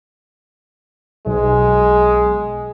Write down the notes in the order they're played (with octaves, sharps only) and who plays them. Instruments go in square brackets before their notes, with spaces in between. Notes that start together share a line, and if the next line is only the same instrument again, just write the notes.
[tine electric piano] B1 [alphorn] G#3